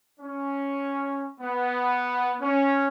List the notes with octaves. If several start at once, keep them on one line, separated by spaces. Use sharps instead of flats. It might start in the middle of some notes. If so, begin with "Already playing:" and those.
C#4
B3
C#4